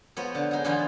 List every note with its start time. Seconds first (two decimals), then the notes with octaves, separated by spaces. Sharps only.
0.17 F3 B3 C5 C#5
0.35 D3
0.51 D#4 G#4
0.65 D3 E3 F3 B3 F4